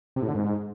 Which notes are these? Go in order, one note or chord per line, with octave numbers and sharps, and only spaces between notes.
C3
A2
D3
G#2